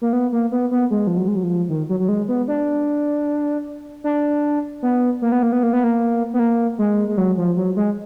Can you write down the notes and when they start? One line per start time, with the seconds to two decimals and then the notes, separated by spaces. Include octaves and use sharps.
0.02 A#3
0.13 B3
0.32 A#3
0.52 B3
0.71 B3
0.91 G#3
1.07 F3
1.17 F#3
1.28 G#3
1.36 F#3
1.43 F3
1.69 D#3
1.89 F#3
2.00 F#3
2.08 G#3
2.28 B3
2.48 D4
4.04 D4
4.83 B3
5.22 A#3
5.32 B3
5.43 A#3
5.52 B3
5.63 A#3
5.73 B3
5.84 A#3
6.34 B3
6.39 A#3
6.79 G#3
7.08 G#3
7.18 F#3
7.37 F3
7.57 F#3
7.76 G#3